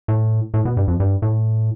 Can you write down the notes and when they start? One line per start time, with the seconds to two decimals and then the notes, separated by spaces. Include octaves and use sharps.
0.08 A2
0.54 A2
0.65 B2
0.77 G2
0.88 F2
1.00 G2
1.22 A2